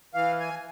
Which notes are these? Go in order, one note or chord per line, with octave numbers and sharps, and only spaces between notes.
E3 F5
G#5